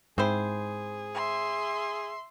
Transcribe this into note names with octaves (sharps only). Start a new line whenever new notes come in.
G#2 C4 E4 G#4 C5
E5 C6